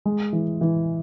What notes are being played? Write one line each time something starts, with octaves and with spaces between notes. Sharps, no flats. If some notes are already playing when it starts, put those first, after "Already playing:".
G#3
E3
E3